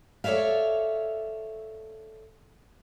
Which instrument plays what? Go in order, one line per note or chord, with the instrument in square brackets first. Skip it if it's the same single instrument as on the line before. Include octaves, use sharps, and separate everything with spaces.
[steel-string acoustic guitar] A4 C#5 D5 E5 F5